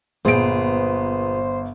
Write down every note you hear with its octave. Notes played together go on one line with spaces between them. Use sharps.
G1 A#2 B3 G#4 C5 D7